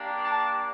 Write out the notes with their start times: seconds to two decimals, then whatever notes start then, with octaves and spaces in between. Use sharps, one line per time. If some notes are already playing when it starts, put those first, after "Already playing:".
Already playing: A#3 D4 G4
0.23 A5